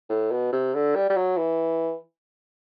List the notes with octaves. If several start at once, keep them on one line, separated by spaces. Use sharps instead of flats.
A2
B2
C3
D3
G3
G3
F#3
E3